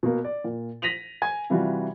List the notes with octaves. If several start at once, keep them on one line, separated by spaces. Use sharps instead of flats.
B2 A#3
D5
A#2
A#6 B6 D#7 F7 F#7
G#5 G#6
C3 E3 G3 F4 F#4